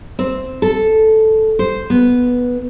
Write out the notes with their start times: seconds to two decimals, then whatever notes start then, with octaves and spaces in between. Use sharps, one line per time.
0.19 C4
0.62 A4
1.59 C5
1.90 B3